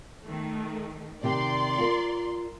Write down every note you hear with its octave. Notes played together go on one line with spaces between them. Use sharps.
D#3 A3
C3 D#3 G4 D5 C6
F4 A#4